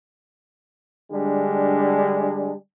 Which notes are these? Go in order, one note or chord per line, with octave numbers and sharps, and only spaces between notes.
D3 G3 G#3 D4